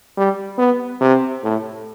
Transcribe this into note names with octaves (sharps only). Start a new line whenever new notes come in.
G3
B3
C3
A2